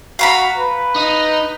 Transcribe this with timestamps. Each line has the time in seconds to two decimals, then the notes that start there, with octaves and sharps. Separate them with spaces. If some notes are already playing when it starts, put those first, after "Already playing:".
0.19 F#4 F5 A#5 B5
0.58 B4
0.96 D#4